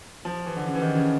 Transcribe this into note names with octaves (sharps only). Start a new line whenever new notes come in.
F3
E3
D3
C#3
E3
D#3
C#3